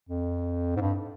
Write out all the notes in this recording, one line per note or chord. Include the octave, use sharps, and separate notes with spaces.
F2
G#2
G2